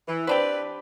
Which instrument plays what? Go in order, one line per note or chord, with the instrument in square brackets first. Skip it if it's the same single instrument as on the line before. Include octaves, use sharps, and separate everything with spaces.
[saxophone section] E3
[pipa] C4 D4 G4 [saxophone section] B4 D5